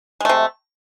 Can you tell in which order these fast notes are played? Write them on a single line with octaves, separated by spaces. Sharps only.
G#3 A3 C3